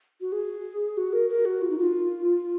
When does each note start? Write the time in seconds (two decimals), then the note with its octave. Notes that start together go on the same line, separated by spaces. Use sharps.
0.21 F#4
0.32 G#4
0.97 F#4
1.13 A#4
1.29 A#4
1.45 F#4
1.62 F4
1.70 D#4
1.79 F4